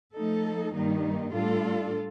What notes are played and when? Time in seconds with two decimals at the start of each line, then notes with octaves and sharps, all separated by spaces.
0.14 F3 A3 D#4 A4
0.73 G2 D#3 G3 A#3 D#4
1.33 A2 G3 D4 F4 A4